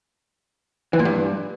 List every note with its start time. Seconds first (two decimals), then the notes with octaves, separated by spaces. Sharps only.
0.93 E3
0.99 A#2
1.05 G2